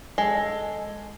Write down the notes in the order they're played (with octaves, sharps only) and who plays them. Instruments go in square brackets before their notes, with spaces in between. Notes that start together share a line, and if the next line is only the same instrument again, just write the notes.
[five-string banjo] G#3 A4